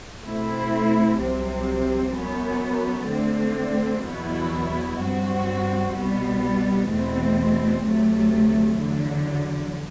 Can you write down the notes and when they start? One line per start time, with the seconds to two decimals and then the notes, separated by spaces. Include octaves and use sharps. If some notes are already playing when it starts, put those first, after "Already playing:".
0.23 B2 A3 C4 E4
1.18 C2 C3 F#3 C4
2.13 F#2 F#3 B3
3.08 D3 A3 C4
4.03 E2 B2 F#3 B3 E4
4.99 G2 F#3 C4 F#4
5.94 C2 B2 G3 B3
6.89 E2 B2 A3 C4
7.84 D2 C3 F#3 A3
8.79 E2 D3 F#3